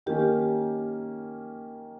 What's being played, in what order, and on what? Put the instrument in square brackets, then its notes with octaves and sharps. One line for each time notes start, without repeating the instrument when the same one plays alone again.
[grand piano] D#3 A#3 C#4 [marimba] G4